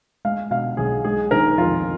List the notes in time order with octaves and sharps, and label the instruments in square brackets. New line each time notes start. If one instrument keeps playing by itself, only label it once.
[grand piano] G#3 F5
B2 F5
B1 G#4
G#3 G#4
D#3 A#4
F2 F4